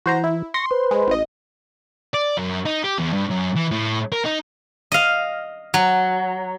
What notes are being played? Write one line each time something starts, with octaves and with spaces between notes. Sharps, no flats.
E3 F#4 C5 A#5
E4
C6 C#6 A#6
B4 C5
G#3
A1 D#5
D5
F#2
D#4
G4
E2
G2
F#2
E3
A2
A#4
D#4
D#5 F5
F#3